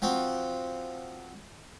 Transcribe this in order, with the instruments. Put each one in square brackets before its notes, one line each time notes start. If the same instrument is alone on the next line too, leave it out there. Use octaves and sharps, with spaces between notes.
[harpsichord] F3 C4 F#4